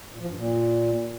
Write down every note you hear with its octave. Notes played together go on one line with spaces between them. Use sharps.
A#2
F3
G2
A#2